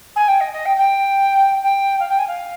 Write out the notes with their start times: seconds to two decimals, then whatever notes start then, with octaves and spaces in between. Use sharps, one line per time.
0.16 G#5
0.28 G5
0.40 D#5
0.53 D#5
0.65 G5
0.77 G5
1.62 G5
1.99 F5
2.08 G5
2.18 G#5
2.27 F5